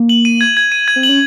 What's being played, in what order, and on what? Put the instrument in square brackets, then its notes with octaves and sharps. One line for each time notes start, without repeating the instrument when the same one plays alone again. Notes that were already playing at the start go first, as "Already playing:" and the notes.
Already playing: [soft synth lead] A#3
[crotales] F#7
D#7
G#6
G#6
D#7
G#6
[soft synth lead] C4
[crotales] F#7
[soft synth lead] C#4